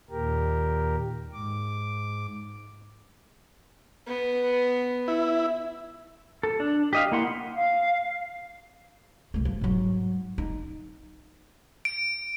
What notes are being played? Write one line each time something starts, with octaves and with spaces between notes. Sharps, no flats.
D#2 A#2 G4 A#4
G#2 D6
B3
E4
A4
D4
G4 D#5 F5
A#3 E4 F#5 C6
F5
C2 A3
F3
G#2 F#3
D#4
D7